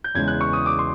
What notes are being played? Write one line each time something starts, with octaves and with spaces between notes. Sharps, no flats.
G6
E2 C#3 E3 G#3 G#6
F#6
C#6
D#6
D6
C6